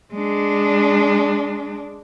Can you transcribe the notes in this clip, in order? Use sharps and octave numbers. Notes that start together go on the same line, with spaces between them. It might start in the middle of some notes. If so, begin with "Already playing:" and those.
G#3 D4